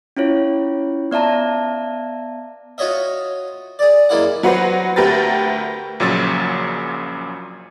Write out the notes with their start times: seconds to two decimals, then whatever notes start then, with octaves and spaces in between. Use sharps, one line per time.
0.17 C#4 E4 F4 C#5
1.11 B3 D5 E5 A5 A#5
2.78 F4 F#4 C#5 D#5 E5
3.79 G#4 D5
4.09 F#2 G#3 A#3 E4 D5 F#5
4.43 F#3 F#4 B4 C5
4.96 D2 G4 A#4 B4 A6
6.00 A#1 A#2 C#3 F#3 E6 A6